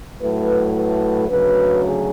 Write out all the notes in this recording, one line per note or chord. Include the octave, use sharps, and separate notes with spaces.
A2 F#3 A3 B4
B4
D2 C#3 F#3 B4
G#4